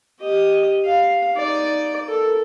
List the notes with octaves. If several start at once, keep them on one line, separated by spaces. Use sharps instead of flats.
G4 D#5
F5
D#4 D5
A4 A#4